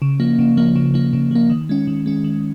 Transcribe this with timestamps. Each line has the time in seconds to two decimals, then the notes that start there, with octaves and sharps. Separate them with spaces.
0.02 C#3
0.20 F3 A#3
0.39 C#3
0.57 F3 A#3
0.76 C#3
0.94 F3 A#3
1.13 C#3
1.31 F3 A#3
1.50 D#3
1.69 G#3 C#4
1.87 D#3
2.06 G#3 C#4
2.24 D#3